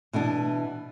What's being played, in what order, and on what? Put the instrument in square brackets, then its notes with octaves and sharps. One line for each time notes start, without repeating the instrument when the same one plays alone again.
[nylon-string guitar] B2 E3 B3 D4